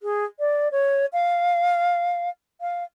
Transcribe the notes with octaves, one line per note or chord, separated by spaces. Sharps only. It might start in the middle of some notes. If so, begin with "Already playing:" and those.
G#4
D5
C#5
F5
F5